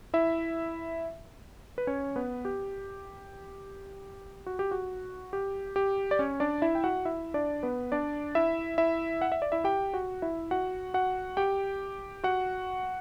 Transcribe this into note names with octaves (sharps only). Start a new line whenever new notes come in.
E4 E5
B4
C#4 C#5
B3 B4
G4
F#4
G4
F#4
G4
G4
D5
C#4 C#5
D4 D5
E4 E5
G5
F#4 F#5
E4 E5
D4 D5
B3 B4
D4 D5
E4 E5
E4 E5
F#5
E5
D5
E4 E5
G4 G5
F#4 F#5
E4 E5
F#4 F#5
F#4 F#5
G4 G5
F#4 F#5